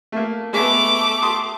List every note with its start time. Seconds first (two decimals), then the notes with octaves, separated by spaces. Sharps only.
0.12 A3 A#3
0.53 G#3 A3 B3 D6
1.22 A5 C6 D#6